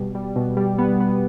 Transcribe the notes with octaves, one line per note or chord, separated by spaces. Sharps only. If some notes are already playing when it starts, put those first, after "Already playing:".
Already playing: B2 G3
G3
B2
G3
B3
B3